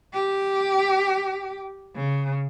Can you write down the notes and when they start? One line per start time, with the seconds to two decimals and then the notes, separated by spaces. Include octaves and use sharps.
0.14 G4
1.96 C#3